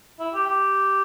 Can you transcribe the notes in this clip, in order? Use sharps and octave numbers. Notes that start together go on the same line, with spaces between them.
E4
G4
G4